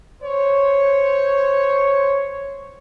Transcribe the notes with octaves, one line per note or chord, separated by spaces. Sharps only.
C5 C#5